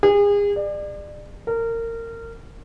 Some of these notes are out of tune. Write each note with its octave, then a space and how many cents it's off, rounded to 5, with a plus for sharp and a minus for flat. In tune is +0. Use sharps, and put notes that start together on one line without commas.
G#4 -35
D5 +30
A#4 -25